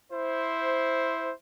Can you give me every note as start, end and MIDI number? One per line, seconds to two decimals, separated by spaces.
0.11 1.30 64
0.11 1.30 72